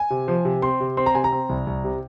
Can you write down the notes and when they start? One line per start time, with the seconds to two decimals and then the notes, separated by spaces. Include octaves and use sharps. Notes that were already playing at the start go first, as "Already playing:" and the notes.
Already playing: G#5
0.10 C3
0.28 F3
0.45 C3
0.62 C4 C6
0.80 C3
0.97 C4 C6
1.06 A#5
1.15 C3 G#5
1.24 A#5
1.32 C4
1.49 C2
1.67 C2
1.84 C3